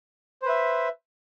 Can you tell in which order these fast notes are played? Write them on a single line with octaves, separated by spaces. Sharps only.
C5 B4 E5